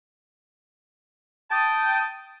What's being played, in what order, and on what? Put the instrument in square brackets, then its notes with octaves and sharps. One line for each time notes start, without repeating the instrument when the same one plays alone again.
[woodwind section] G5 A5 D#6